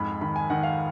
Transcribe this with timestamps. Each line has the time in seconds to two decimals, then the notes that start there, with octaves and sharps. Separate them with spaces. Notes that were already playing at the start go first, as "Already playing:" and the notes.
Already playing: F2 G#2 B5
0.21 D#3 B5
0.36 G#5
0.50 D#3 F#5
0.63 F5